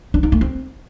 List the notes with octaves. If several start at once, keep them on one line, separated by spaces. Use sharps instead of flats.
D4
D#4
A3
C4